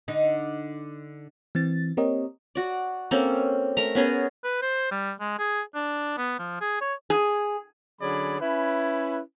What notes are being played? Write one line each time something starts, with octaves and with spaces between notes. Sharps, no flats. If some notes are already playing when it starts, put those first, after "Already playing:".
D3 D#4
E3 C4 A6
A#3 C4 G4 A#4 C#5 D#5
F#4 D5
A#3 C4 C#4 A4
A3 A#4 A#5
B3 C#4 G#4 A#4
B4
C5
G3
G#3
G#4
D4
B3
F3
G#4
C#5
G#4
D3 F#3 C#4 G#4 D5 B5
C#4 E4 B4